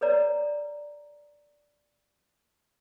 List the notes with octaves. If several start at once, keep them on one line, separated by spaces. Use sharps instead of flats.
A4 B4 C#5 D5 A#5